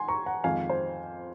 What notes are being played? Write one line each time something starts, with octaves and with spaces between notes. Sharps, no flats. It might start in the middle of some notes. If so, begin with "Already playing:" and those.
Already playing: F#5 G#5 C6
A#5 C#6
F#5 A#5
F2 D#3 G#3 F5 G#5
C5